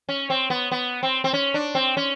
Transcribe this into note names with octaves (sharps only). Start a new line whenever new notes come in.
C#4
C4
B3
B3
C4
C4
C#4
D4
C4
C#4